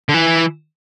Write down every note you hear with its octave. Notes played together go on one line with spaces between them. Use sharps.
D3
E3